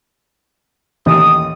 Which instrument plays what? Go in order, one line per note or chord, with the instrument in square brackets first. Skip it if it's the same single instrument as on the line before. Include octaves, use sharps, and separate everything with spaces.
[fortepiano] A1 D#2 D#3 [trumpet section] D#6